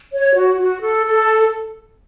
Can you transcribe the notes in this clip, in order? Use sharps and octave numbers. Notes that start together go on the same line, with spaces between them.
C#5
F#4
F#4
A4
A4